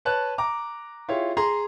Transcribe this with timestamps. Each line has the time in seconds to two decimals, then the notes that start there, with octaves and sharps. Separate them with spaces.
0.05 B4 C#5 A5 F#6
0.38 A#5 D6
1.08 E4 F4 G4 G#4 C#5
1.37 G#4 A#5 C6